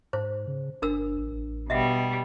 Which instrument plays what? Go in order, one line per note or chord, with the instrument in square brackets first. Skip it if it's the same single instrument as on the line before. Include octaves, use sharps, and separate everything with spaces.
[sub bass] G#2 [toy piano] C5
[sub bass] C#3
[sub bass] G1 [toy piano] D4 A#4 E6
[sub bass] A1
[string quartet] B2 G3 [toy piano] D#5 E5 F#5